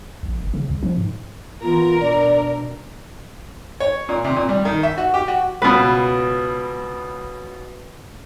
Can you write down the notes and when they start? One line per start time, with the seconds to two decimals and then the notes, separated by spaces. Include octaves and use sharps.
0.23 A#1
0.41 F#1
0.54 C#3
0.69 C2
0.83 F3
0.96 G#2
1.62 E3 B3 F4 A#4
2.00 B2 D4 D5
3.80 C#5
4.09 A#2
4.24 C3
4.36 A#2
4.49 G3
4.65 D#3
4.83 E5
4.98 F#4
5.14 G4
5.28 F#4
5.62 C#2 B2 B4